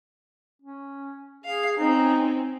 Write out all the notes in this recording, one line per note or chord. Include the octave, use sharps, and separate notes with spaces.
C#4
G#4 F5 C7
C4 C#4 D#4